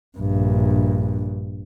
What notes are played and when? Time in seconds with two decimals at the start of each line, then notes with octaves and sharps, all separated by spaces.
0.18 A#1 G2